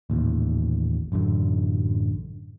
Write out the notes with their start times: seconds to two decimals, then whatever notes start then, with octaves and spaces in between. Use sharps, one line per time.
0.10 A1 D#2 A#2
1.12 A1 F#2 D3 F#3